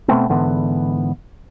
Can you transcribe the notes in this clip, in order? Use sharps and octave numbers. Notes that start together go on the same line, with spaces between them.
B2 A3 B3 C4
G#2 D3 E3 B3